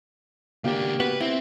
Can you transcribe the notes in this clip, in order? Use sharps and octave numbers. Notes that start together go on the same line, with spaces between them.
C#2 A#3 D4 G4
B3 F#4 B4
C4 E4